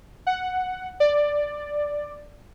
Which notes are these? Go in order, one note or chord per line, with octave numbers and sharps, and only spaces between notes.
F#5
D5